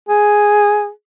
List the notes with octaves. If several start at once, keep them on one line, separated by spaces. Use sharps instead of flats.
G#4